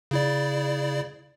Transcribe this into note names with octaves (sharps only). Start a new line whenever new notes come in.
C#3 E4 D5